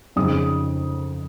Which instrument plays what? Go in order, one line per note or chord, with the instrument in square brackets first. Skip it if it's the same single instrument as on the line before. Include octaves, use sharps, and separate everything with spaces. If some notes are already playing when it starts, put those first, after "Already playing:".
[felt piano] F2 C#3 G#3 D#4 D#6